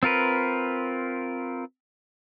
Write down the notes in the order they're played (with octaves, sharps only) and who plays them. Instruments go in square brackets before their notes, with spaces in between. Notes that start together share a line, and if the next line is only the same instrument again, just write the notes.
[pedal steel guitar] C4 F4 A#4 B4